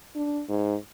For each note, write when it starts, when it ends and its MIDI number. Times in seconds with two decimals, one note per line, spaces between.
0.16 0.42 62
0.49 0.75 44